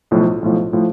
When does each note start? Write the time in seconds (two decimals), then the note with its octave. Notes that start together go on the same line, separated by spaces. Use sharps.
0.11 B1 A2 F3
0.42 B1 A2 F3
0.73 A2 F3